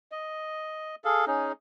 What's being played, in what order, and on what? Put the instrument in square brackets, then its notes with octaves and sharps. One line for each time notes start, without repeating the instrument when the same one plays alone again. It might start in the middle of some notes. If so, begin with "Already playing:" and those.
[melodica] D#5
G#4 A4 F5
C#4 D#4 G#4